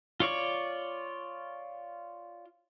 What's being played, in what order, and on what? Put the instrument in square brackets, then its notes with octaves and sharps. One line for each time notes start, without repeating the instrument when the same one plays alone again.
[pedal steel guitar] F4 C#5 D5 C#6